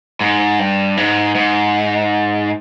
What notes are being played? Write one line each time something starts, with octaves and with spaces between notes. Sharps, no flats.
G#2
G2
G#2
G#2